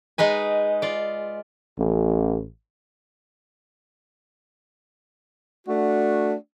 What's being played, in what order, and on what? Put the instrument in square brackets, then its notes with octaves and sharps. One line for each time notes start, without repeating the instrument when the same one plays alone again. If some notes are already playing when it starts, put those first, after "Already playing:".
[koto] G#3 D#4 B4 G#5
F4 D5
[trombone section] A1
[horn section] A3 D4 F#4